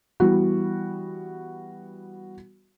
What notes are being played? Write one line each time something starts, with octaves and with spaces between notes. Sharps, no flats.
E3 G3 B3 F#4